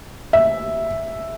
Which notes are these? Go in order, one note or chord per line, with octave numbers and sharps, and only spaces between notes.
E5